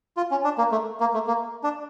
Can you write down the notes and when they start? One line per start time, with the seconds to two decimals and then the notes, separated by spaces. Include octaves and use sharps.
0.17 F4
0.31 C#4
0.44 D4
0.58 A#3
0.72 A3
1.00 A#3
1.14 A3
1.27 A#3
1.63 D4